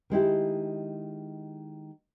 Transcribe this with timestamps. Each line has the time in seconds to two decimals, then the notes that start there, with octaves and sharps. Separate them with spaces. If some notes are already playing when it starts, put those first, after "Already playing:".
0.10 D#3 G#3 E4 G4